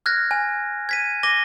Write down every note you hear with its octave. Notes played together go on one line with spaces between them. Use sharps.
F6 F#6 G#6 A#6
G#5
G#6 B6 D#7
D6 A#6 D#7 G7